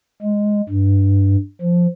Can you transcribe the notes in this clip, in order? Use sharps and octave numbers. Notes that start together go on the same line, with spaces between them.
G#3
G2
F3